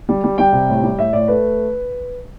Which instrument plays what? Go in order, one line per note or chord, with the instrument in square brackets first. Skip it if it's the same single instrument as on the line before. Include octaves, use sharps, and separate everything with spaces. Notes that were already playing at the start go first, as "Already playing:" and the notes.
[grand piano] G3
G3
G3 G5
C3
A2
G3
A2 E5
A2 D5
A3 B4